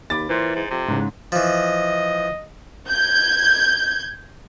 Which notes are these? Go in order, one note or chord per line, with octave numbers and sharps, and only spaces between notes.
D#2 B5 D6 A6
A#2 E3 C5 C6
G#2
F2 C3
E2 G#2 C#3 G#3
E3 F3 D#5
G6 G#6